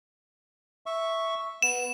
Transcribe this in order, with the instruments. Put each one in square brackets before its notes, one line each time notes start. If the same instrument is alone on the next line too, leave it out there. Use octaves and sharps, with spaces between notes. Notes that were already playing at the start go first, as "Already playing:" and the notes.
[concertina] E5 C#6
[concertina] B3 [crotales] E7